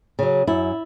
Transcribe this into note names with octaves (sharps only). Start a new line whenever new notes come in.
C#3 F#3
F#2 E4